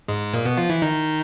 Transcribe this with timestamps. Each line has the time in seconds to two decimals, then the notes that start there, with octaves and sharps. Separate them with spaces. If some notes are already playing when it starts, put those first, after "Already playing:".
0.08 G#2 G#3
0.34 A#2 A#3
0.46 B2 B3
0.57 F3 F4
0.70 E3 E4
0.82 D#3 D#4